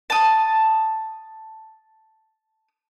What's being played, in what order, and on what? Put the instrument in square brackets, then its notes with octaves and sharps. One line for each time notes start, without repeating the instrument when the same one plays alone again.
[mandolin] A5 D#6